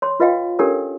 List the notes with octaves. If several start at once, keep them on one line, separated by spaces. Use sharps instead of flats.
C#5 C6
F4 B4 D#5 F5 G5
C#4 D4 G4 A4 A#4 C#5